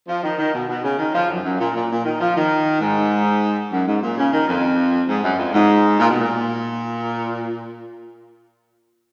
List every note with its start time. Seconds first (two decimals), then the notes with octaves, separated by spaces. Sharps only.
0.08 F3
0.23 D#3
0.39 D#3
0.54 B2
0.68 B2
0.84 C#3
0.99 D#3
1.15 F3
1.30 F#2
1.45 F#2
1.60 A#2
1.75 A#2
1.90 A#2
2.05 D#3
2.21 F3
2.36 D#3
2.81 G#2
3.72 F#2
3.88 G#2
4.03 A#2
4.17 C#3
4.33 D#3
4.48 F2
5.09 G#2
5.24 F#2
5.39 F2
5.54 G#2
6.00 A#2
6.10 B2
6.21 A#2